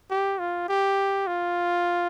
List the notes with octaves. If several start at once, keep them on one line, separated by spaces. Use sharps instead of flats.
G4
F4
G4
F4